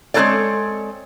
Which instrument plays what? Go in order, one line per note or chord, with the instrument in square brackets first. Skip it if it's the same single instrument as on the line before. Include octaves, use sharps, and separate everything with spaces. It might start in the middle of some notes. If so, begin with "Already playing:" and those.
[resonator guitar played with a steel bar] G#3 C4 D#4 A4 C#5 D5